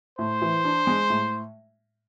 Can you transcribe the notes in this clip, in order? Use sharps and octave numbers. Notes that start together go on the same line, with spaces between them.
A2 C5
E3
D4
G#3
A2